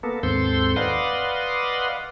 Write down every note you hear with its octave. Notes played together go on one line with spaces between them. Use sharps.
A#3 B3 A4
D#2 G#2 C4 A4 C6 G6
B4 D5 D#5 F5 F#5 C6